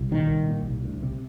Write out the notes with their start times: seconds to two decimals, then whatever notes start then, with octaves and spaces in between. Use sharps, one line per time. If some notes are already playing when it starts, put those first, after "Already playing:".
Already playing: C2
0.11 A#2 D#3
0.29 C2
0.48 A#2
0.66 C2
0.84 D2
1.03 C3